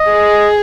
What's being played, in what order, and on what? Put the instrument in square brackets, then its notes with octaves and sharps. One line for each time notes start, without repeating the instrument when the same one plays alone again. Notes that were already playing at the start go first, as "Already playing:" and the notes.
Already playing: [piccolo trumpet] D#5
[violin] G#4